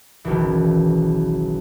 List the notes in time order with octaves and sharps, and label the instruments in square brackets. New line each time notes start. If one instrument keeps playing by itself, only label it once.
[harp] F#1 B1 D#3 E3